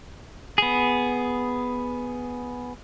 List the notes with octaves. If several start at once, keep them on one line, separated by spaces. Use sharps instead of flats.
B3 G#4